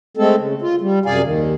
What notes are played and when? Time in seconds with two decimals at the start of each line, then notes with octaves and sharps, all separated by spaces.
0.17 G#3 A3 C4 A4
0.37 C#3
0.62 F4
0.81 G3
1.06 F#2 C3 G#4 D5 F5 G#5
1.24 D#2 D#3